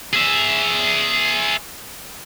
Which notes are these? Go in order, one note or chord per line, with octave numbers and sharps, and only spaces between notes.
G#4 E5